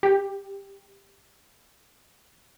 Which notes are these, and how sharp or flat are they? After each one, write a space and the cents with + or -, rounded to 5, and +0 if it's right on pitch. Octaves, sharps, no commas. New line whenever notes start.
G4 +10